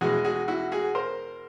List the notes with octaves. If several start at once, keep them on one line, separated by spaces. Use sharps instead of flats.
E2 B2 G#3 F#4 G#4
F#4 G#4
E4 F#4
F#4 G#4
A#4 C5